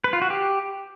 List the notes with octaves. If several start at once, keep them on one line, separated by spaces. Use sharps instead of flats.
B4
F4
F#4
G4